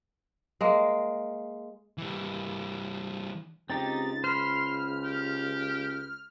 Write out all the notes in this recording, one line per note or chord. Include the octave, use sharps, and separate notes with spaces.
G#3 A#3
E3 G3
C#2 C4 D#4 G4 A6
C5 B5 C6 F6
G4